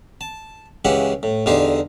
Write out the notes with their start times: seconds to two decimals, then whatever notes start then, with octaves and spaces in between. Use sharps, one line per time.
0.21 A5
0.85 C#2 C#3 E3 G4 F5 F#5
1.23 A2
1.46 E2 D3 D#4 G4 C5 F5